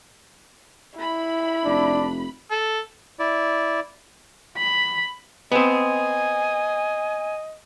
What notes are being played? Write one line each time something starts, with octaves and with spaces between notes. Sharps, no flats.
E4 B5
F1 D4
A4
E4 D5
B5
B3 C4 D#5 G#5